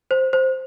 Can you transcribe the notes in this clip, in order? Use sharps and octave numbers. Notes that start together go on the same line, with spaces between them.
C5
C5